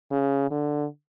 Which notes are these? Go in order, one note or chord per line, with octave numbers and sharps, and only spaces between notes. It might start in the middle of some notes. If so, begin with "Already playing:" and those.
C#3
D3